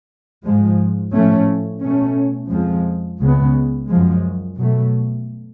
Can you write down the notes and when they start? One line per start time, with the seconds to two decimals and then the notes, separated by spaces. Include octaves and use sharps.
0.44 G#2 F3 G#3
1.13 A2 F3 A3 C#4
1.82 B2 A3 C#4
2.50 F2 F3 G#3
3.20 C#2 C#3 G#3 B3
3.89 F#2 F3 G#3
4.57 B2 F#3 A3